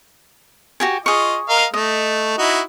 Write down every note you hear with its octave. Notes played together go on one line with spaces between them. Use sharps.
F#4 G4 G#5
F4 G#4 D#5 C#6
A#4 D#5 F5
A3 D#5
D#4 E4 F#4